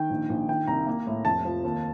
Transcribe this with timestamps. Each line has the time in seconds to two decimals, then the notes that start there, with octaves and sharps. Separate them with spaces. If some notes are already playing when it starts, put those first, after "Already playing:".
Already playing: D#3 G5
0.10 A#1
0.29 A#1
0.48 D#3 G5
0.67 C2 A#5
0.87 A#3
1.07 A2
1.25 F1 A5
1.45 F3
1.64 D#2